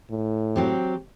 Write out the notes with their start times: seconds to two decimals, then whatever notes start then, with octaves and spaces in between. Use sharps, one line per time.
0.10 A2
0.56 F#3 C4 G4